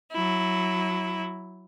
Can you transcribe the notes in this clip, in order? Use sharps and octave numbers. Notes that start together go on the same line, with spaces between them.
F#3 E4